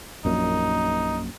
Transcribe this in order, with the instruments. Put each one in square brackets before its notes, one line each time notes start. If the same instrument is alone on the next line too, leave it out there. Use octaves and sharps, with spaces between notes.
[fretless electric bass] A#1 F#2 A#2 [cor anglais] D#4